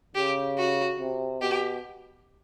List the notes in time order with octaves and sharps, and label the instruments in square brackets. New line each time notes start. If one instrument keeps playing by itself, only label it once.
[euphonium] C#3 [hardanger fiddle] G4
[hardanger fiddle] F#4
[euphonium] C3
[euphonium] B2 [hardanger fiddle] G4